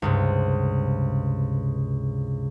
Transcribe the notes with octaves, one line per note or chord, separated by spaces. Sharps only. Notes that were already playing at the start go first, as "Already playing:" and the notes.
C#2 G2 C3